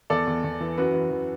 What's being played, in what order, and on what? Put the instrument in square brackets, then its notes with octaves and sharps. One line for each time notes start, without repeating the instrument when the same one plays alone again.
[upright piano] E2 A4 D5
E2
E2
E3
F#2 F#4 B4
E3
E3